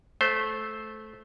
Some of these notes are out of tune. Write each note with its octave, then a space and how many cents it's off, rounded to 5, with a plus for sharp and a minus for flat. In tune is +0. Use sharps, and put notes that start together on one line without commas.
A3 -15 C5 +0